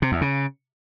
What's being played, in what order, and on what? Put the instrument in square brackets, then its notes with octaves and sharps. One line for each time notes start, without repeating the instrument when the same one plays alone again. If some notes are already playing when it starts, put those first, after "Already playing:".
[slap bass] C3
E2
C#3